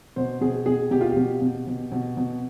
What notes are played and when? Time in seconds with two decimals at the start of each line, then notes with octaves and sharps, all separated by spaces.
0.16 B2 C5
0.41 B2 G#4
0.66 B2 G#4
0.91 B2 G4
1.01 F4
1.09 G4
1.17 B2
1.42 B2
1.67 B2
1.92 B2
2.17 B2